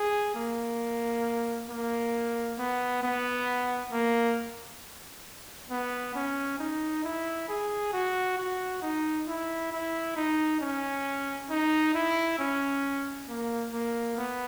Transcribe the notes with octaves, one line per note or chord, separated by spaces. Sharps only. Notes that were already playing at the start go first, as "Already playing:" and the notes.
Already playing: G#4
A#3
A#3
B3
B3
A#3
B3
C#4
D#4
E4
G#4
F#4
F#4
D#4
E4
E4
D#4
C#4
D#4
E4
C#4
A#3
A#3
B3